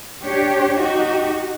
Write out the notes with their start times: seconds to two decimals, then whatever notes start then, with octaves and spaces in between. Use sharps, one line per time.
0.23 D4 G4 C#5
0.78 D#4 F#4 G4